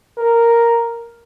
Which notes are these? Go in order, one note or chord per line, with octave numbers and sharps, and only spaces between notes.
A#4